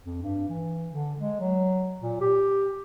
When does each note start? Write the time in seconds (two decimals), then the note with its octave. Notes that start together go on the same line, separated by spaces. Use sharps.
0.05 F2
0.22 G2
0.49 E3
0.89 D3
1.19 G#3
1.40 F#3
2.01 A#2
2.21 G4